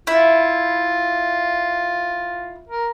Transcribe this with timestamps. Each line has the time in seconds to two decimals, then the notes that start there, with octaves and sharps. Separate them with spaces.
0.07 E4 F4
2.69 A#4